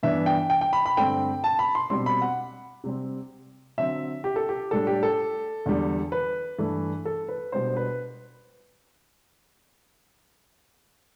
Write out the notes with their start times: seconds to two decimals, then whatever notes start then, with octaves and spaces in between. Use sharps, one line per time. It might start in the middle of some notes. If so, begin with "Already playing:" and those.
0.03 G2 E3 B3 D4 E5
0.26 G5
0.50 G5
0.61 G5
0.73 B5
0.86 B5
0.97 G2 D3 A3 C4 G5
1.44 A5
1.59 B5
1.75 C6
1.90 B2 G3 C4 C6
2.06 B5
2.22 F#5
2.84 C3 G3 C4
3.78 D3 F#3 C4 E5
4.24 G4
4.36 A4
4.49 G4
4.71 A2 G3 D4 A4
4.87 G4
5.03 A4
5.66 E2 D3 G3
6.12 B4
6.59 G2 E3 A3
7.05 A4
7.28 B4
7.52 B2 G3 B3 D4 C5
7.76 B4